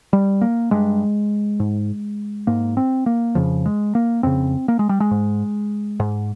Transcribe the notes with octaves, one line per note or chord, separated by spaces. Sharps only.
G3
A#3
G2 G#3
G#2
G#2 A#3
C4
A#3
F2 C#3 F3
G#3
A#3
F2 C#3 C4
A#3
G#3
G3
G#3
G#2
G#2